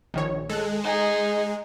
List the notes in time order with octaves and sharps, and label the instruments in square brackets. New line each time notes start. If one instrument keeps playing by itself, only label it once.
[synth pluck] A#1 D#3 C#5
[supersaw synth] G#3 [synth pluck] A4 F#6
[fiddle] D#4 G#4